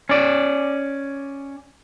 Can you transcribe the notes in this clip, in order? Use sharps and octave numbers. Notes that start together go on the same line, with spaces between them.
C#4 D5